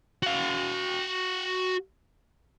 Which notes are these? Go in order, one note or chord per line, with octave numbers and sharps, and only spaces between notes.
F#4 F5